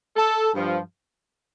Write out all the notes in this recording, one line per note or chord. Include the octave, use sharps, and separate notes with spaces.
A4
G2 F3